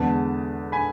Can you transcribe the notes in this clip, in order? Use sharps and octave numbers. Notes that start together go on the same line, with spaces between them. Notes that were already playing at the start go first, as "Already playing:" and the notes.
Already playing: E2 D3 G#3 B3 A5
G#5 B5